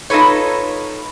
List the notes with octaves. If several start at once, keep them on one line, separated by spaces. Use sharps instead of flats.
D#4 F4 A4 B4 C#5